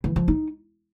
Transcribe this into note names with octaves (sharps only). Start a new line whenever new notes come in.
E3
F3
D#4